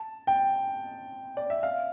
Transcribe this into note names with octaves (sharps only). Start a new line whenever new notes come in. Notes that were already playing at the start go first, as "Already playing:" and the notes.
Already playing: A5
G5
D5
E5
F5